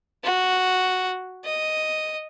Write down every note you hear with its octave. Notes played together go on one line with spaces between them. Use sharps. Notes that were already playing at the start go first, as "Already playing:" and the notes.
F#4
D#5